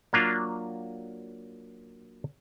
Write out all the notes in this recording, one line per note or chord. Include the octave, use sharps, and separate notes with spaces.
F#3 A#3 D4 F4